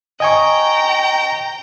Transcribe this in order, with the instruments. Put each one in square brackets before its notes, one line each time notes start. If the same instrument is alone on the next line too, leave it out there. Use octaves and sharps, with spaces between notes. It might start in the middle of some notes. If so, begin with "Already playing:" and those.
[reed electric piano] D#5 G#5 C#6 [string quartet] G5 A#5